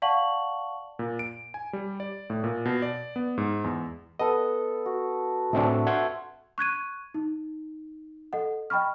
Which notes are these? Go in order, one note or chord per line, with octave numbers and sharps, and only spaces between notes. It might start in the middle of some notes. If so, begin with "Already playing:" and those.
D5 F5 F#5 A5 C#6 F#7
A#2
D7
G#5
G3
D5
A2
A#2
B2
D5
B3
G#2
E2
B3 A4 D#5
F#4
A2 C4 D4 E5 A5 C#6
C5 E5 F#5 G#6
C#6 F#6 G#6 D#7
D#4
A4 D#5 F#5
D#5 G5 B5 C#6 F6